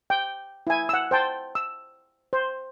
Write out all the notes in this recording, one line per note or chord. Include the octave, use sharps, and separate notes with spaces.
G5
E4 G#5
F#5 E6
C5 G5 A5
E6
C5